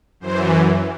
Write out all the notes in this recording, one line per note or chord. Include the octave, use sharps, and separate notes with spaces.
F#2 E3 C5